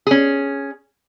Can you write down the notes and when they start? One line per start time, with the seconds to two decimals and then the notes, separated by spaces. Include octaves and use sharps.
0.07 C#4 G#4